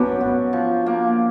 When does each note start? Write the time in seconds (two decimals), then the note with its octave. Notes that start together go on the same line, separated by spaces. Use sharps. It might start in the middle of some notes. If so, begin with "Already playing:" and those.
Already playing: F#2 B3 D4
0.21 F#4
0.53 F3
0.86 A#3